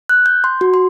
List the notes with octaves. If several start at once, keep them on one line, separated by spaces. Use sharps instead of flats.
F#6
G6
C6
F#4
C6